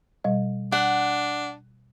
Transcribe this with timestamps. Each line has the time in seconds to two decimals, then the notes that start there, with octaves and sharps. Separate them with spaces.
0.24 B2 G3 D#5
0.72 D4 F#5